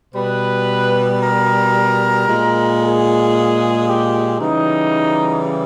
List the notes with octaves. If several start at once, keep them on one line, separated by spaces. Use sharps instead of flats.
B2 G3 B4
A#4
A#2 G#3
G#4
G4
C#3 E3 G3 D#4